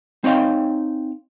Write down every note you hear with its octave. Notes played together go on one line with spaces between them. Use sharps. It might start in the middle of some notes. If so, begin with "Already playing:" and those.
C4 D#4 C#5 F5 G5